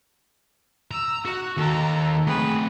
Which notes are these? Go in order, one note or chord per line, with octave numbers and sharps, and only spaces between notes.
A#5 E6
F#4 F#5
D#2 A4 A#5
A3 C4 G#4 B4